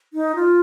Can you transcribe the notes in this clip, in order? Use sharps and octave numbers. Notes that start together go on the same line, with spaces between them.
D#4
F4